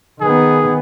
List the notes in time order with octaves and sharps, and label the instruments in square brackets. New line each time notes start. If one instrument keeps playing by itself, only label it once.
[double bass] D#3 B3 [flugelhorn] G#4